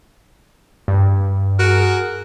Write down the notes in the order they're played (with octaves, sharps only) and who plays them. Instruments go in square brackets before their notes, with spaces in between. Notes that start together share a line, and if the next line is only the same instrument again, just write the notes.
[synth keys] G2
[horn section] F#4 G#4 A#4